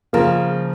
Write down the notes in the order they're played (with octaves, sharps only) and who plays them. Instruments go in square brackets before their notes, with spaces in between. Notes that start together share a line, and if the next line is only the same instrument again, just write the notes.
[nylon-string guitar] C#3 F3 [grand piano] A#3 F4 A#4